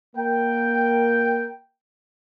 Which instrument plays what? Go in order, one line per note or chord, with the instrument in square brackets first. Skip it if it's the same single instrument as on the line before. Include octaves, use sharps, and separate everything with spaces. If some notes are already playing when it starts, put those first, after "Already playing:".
[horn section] A#3 A#4 G5